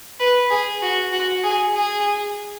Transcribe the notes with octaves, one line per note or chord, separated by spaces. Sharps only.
B4
G#4
F#4
F#4
G#4
G#4